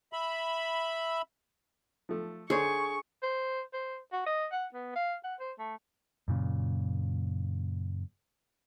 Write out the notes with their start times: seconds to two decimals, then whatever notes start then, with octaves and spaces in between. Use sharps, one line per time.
0.13 E5 B5
2.09 F3 A3
2.50 D3 G#4 C5 C#5 C#6
3.23 C5
3.74 C5
4.12 F#4
4.26 D#5
4.52 F#5
4.74 B3
4.96 F5
5.24 F#5
5.40 C5
5.59 A3
6.28 F#2 A#2 C#3